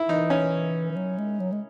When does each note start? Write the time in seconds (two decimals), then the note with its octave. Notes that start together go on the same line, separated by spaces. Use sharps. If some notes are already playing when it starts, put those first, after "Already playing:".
Already playing: E4
0.08 E3 D#4
0.30 C#4
0.91 E3
0.96 F#3
1.18 G#3
1.40 F#3
1.52 G#3